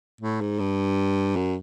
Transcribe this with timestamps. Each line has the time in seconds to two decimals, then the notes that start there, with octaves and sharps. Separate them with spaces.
0.21 A2
0.41 G#2
0.60 G2
1.36 F#2